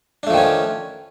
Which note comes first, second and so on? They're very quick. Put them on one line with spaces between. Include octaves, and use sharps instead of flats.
D4 A3 F3 D#3 C#4